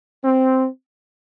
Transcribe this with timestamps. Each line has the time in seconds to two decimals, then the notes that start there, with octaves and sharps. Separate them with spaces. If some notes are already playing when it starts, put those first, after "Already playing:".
0.25 C4